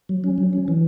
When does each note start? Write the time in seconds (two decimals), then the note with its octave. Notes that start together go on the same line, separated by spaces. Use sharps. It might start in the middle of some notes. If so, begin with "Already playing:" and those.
0.09 F#3
0.24 C#4
0.38 F#3
0.53 C#4
0.68 E3